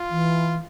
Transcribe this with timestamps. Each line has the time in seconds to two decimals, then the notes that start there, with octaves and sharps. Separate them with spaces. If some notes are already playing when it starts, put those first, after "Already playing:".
Already playing: F4
0.09 E3